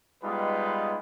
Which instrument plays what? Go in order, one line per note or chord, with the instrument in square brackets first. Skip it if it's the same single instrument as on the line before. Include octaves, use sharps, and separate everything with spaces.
[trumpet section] G3 G#3 B3 D#4 F4 B4